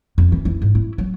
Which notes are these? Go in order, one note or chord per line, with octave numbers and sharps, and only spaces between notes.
F2
E3
E4
G#2
E4
F#3